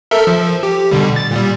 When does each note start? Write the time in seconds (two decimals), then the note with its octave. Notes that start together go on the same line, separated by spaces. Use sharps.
0.11 A4 A#4 E5
0.27 F3
0.63 G4
0.91 B2 D3 G3
1.16 A6
1.31 A#2 G3